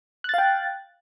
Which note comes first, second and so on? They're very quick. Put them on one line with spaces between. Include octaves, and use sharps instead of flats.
F#6 A6 F5 G5